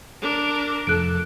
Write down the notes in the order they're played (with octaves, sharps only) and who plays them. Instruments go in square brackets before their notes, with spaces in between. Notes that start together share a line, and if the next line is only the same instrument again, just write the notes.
[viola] D4 A#4
[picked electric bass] F1 F2 [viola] A4 [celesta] F#6 D7